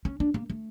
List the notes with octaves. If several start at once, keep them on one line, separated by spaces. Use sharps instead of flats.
C#4
D4
A#3
A3